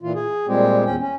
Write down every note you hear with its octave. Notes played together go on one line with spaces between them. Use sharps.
A#2 E3 F4
G#4
A#2 G3 G#3 C4 G4
E2 C#4 G5
C#4